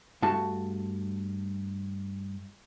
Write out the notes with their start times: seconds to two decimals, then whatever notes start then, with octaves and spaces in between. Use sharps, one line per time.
0.22 G2 A3 F#4 A5